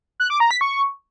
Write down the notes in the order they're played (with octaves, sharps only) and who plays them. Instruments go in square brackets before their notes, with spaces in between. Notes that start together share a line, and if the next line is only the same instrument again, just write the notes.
[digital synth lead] F#6
D6
A#5
B6
C#6